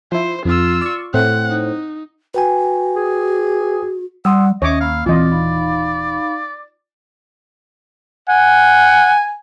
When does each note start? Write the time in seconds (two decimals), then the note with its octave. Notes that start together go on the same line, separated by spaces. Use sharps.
0.12 F3 E4 C5
0.45 F2 F4 E6
0.81 D5 C#6
1.14 A2 C4 F#5
1.50 D#4
2.34 F#4 B4 G5 G#5
2.96 G#4
4.25 G3 F#5 C6 D#6 E6
4.62 D#2 C#4 C#5 D#5 E5 D6
4.81 A#3 F5 B5 E6
5.06 D#1 E3 C4 F4 D5 D#5
5.32 D#4 F5 B5
8.29 F#5 G#5